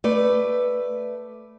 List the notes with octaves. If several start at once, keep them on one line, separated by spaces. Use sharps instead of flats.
A3 B4 D5